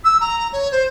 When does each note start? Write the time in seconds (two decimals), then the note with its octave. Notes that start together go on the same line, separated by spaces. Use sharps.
0.04 E6
0.21 A#5
0.53 C#5
0.72 C5